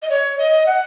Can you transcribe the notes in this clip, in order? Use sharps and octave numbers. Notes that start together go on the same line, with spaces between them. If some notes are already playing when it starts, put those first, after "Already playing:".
D#5
C#5
D#5
F#5